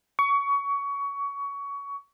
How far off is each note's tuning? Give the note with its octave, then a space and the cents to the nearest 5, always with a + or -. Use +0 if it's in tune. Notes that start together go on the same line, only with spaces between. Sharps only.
C#6 +25